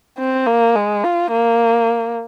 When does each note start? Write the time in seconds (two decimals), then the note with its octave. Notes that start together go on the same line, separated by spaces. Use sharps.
0.19 C4
0.46 A#3
0.76 G#3
1.04 F4
1.31 A#3